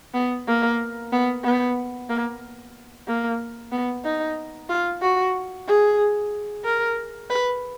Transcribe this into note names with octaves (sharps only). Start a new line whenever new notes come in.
B3
A#3
B3
B3
A#3
A#3
B3
D#4
F4
F#4
G#4
A#4
B4